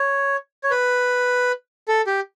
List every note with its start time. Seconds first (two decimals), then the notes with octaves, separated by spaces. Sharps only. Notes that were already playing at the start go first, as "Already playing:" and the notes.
Already playing: C#5
0.64 C#5
0.71 B4
1.88 A4
2.07 G4